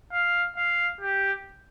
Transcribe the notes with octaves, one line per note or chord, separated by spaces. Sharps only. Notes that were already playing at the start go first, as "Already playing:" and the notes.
F5
F5
G4